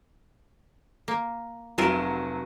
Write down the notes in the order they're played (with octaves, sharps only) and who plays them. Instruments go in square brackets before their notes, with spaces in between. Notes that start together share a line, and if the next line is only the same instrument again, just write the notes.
[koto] A#3
[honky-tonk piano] F1 F#3 E7 [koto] C3 F4 A#4